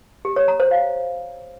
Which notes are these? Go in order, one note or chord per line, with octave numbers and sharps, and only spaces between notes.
G4
C#5
A#5
C5
F5